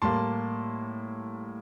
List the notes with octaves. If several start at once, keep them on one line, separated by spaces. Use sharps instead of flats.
A2 G3 A#3 A5 C6